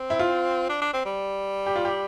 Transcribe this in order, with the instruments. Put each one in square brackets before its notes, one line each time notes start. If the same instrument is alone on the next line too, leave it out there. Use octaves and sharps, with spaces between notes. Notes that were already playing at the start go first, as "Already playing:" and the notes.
Already playing: [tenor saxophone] C4
[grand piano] E4
F4
[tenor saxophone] D4
D4
C4
G3
[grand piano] G4
F4
G4